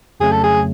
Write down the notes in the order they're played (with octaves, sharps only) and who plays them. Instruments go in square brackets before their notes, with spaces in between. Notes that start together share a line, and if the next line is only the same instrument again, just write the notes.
[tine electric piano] F2 C#3 F#3 A3 [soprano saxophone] G#4
[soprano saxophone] A4
G#4